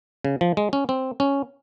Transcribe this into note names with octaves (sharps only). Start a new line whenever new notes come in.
C#3
F3
G#3
C#4
C4
C#4